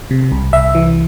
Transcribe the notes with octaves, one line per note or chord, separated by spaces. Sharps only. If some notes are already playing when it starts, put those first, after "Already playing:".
C3
C2
C2 E5
E3